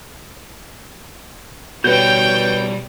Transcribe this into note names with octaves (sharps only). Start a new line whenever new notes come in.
B2 G3 F#4 B4 C#5 G5 G6